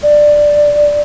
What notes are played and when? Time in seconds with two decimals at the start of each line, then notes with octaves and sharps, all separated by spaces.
0.03 D5